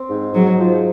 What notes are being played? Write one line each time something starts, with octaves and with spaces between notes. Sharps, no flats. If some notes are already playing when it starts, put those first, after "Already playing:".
Already playing: C4
G#2
G#2 F#3
F3